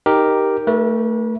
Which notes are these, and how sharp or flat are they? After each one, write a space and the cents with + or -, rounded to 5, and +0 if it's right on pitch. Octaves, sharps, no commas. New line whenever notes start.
D#4 +0 G4 +0 A#4 +0
A3 +20 B4 -40